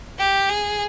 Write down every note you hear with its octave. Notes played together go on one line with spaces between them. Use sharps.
G4
G#4